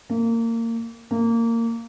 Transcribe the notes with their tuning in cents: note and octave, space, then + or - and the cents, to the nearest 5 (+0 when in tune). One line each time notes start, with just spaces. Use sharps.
A#3 -25
A#3 -20